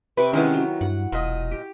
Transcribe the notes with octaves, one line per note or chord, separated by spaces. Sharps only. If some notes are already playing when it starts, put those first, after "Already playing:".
C3 B4 C#6 D6
D#3 G#3 B3 C#4 E4
F#3
G2 F#5
E1 A#2 D#5
G4